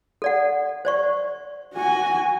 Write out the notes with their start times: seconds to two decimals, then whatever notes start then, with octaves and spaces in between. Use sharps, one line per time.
0.22 A4 D5 F#5
0.85 C5 D5 C#6
1.74 F#4 G#5